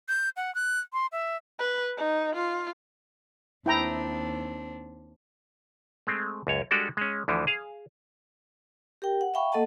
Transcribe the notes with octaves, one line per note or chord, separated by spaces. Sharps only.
G6
F#5
F#6
C6
E5
B4
D#4
F4
D#2 C4 D4 E4 G5 A#5
G#3 A3 C4
C#2 F#2 C#5
G3 G#3 D4 F#4 G4 A4
G#3 C#4
D2 D3 E3 F3
G#4 F5
G4 A#4 G5
F#5
E5 F5 G5 B5 C#6
A#3 A4 D#5 F#5 A5